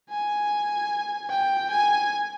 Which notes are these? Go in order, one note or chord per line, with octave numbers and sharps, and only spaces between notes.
G#5
G5
G#5